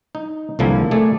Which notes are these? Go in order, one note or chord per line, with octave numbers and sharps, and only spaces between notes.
D#4
C2 D3 F3 A#3 E4 G#4
A3 G#4 D5